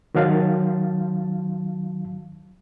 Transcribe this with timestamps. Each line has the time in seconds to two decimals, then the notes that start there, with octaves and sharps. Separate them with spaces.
0.15 D#3 F#3 F5 A5